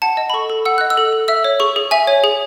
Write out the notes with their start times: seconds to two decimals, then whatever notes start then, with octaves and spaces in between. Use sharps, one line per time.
0.02 F#5 A5
0.17 D#5
0.30 B5
0.34 A4 C#6
0.50 A4
0.65 F#5 E6
0.78 D#5 F#6
0.90 E6
0.98 A4
1.12 A4
1.28 E5 E6
1.44 C#5
1.60 G#4 C#6
1.76 G#4
1.91 E5 G#5
2.07 C#5
2.24 G#4